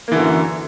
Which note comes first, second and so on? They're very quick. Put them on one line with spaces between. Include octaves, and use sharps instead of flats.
A#3 E3 D3 F#2